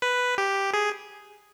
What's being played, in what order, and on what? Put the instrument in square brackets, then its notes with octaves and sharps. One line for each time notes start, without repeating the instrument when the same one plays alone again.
[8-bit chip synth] B4
G4
G#4